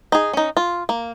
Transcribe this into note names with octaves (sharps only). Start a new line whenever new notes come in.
D#4 G#4
C#4 D#4
F4
A#3